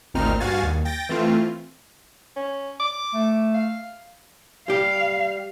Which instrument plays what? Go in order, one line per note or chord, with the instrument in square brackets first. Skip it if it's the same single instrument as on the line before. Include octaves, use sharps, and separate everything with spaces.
[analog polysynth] G#1 D2 A#2 C4 D#4 F6
G2 F#4 F5 G#5 A6
D#2
G5 A6 A#6
E3 A3 C4 F4
[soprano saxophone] C#4
D6
[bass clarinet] A3
[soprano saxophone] F5
[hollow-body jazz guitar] G3 G4 [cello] F5